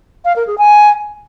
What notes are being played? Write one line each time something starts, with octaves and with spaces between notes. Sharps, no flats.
F5
A#4
G#4
G#5